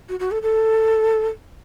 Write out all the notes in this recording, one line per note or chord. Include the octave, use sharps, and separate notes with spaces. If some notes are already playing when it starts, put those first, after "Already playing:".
F#4
F#4
A4
A4